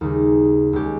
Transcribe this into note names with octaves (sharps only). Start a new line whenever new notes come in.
D#2 C#3 G3 A#3 D#4
C#2 C#3 G#3 C#4 G4